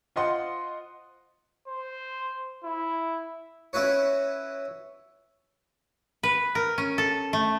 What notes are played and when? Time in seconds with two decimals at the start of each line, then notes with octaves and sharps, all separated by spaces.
0.16 F4 C5 D#5 F#5 C6
1.68 C5
2.64 E4
3.73 C#4 E4 F#4 B4 C#5
6.23 B4
6.55 A#4
6.78 C#4
6.98 A4
7.33 A3